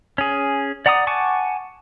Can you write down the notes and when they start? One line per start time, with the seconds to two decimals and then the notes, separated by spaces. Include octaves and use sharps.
0.18 C#4 G#4
0.86 D5 F#5 A#5 D6 D#6
1.07 F#5 G#5 A5 C#6 D6